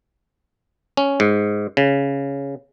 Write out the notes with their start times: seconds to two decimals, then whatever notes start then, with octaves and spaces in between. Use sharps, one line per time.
0.97 C#4
1.20 G#2
1.77 C#3